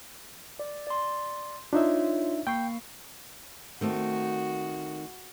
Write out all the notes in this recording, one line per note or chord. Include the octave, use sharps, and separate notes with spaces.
D5
D5 C6
D4 D#4 F4 C#5 E5
A#3 G5 C#6 C7
D#3 A3 C4 F#4